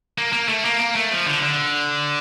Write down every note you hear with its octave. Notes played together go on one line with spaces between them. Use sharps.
A#3
A#3
A3
A#3
A#3
A3
F3
D3
D3